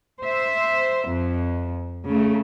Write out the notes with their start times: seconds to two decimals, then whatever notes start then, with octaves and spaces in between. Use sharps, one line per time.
0.23 C5 E5
1.07 F2
2.09 C#3 A3